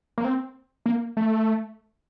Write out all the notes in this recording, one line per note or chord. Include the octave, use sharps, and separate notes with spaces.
A#3
C4
A#3
A3